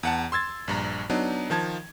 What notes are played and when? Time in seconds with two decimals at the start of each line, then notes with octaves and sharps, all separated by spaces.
0.03 E2 F#5 A5
0.32 C6 E6 G#6 A6
0.68 A#1 G2 A#5
1.10 F#3 B3 D4 D#4
1.50 D#3 F3 A5 G#6